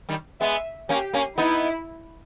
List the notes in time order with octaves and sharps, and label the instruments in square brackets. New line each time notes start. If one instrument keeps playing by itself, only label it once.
[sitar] D#3 G3
[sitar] G#3 B3 [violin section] E5
[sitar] A#3 C#4 [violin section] G4
[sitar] A#3 C#4
[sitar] B3 D#4 [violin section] E4